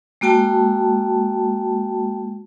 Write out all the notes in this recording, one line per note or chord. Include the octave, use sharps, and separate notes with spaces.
G#3 A#3 F#4 G5 A5